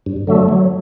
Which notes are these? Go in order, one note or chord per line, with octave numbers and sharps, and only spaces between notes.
G2
D3 F#3 A3
F#3